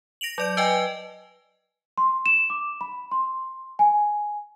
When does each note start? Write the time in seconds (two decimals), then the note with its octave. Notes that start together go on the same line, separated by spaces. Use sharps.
0.21 A#6 D7 F7 F#7
0.38 F#3 D5 D7
0.57 B4 D#5 G5 G#5
1.98 C6
2.26 E7
2.50 D6
2.81 B5
3.12 C6
3.79 G#5